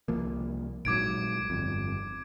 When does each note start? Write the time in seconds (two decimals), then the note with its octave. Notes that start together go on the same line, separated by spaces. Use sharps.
0.08 C2 F3 A#3
0.85 A#1 G#2 F#3 D6 G#6 D7
1.50 G1 F2